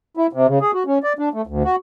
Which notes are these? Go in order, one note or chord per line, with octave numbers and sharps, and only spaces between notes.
E4
C3
C#3
G#4
F#4
C#4
D5
D4
A3
D2
F#4